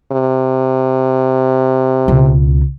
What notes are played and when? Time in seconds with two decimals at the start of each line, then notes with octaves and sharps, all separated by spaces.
0.12 C3
2.08 C#2 B2